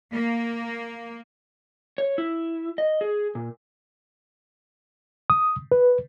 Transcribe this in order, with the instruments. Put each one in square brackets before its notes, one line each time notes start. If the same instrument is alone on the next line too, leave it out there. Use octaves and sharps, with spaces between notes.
[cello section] A#3
[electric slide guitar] C#5
E4
D#5
G#4
A#2
[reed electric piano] D#6
B4